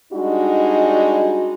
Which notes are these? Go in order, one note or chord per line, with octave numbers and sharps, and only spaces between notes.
G3 G#3 D4 D#4 F#4